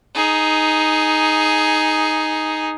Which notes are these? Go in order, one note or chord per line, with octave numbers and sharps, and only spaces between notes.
D#4 G#4